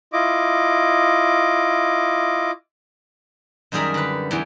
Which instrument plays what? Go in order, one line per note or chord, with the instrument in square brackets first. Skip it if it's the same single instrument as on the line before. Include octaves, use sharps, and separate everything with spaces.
[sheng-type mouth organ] E4 F4 D#5 D6
[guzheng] F#2 D#3 G3 G#4 A#4 E5
D3 B4
E2 E3 G5